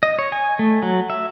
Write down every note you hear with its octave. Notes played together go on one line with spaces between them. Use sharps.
D#5
C#5
G#5
A3
F#3
E5